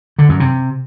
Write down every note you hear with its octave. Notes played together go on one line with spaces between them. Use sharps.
D3
F#2
C3